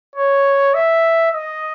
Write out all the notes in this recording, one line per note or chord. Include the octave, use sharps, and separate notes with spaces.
C#5
E5
D#5